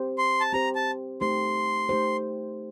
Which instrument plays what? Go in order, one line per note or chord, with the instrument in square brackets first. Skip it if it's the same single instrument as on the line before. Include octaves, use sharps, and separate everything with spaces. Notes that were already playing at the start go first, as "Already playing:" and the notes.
Already playing: [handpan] C4 G4 C5
[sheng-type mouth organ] C6
A5
[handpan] C4 G4 C5 [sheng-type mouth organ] A#5
[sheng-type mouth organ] A5
[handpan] A3 D#4 G4 C5 [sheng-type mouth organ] C6
[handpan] A3 D#4 G4 C5